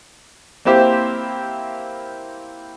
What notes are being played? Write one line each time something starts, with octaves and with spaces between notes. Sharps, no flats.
A#3 C4 E4 G4 C5